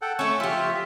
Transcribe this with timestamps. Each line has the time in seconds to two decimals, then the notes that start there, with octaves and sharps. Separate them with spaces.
0.02 A4 F#5 G5
0.19 A3 C#4 C#6 E6
0.40 F3 F4 G4 E5